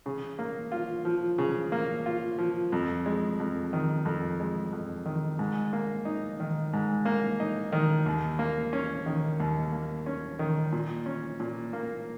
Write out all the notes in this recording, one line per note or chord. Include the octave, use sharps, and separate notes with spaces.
C#3
A#3
F4
F3
C#3
A#3
F4
F3
F2
G#3
F2
D#3
F2
G#3
F2
D#3
G#2
A#3
D#4
D#3
G#2
A#3
D#4
D#3
D#2
A#3
C#4
D#3
D#2
A#3
C#4
D#3
A#2
C#4
A#2
A#3